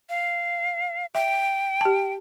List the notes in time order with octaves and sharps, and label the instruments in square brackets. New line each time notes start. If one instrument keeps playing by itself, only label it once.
[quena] F5
[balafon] E5 [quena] G5
[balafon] G4 A5